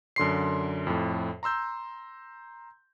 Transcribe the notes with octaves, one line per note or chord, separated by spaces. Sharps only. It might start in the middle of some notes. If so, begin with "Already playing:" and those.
F#2 D3 C6 C7
F2 A2
A#5 C6 E6 G6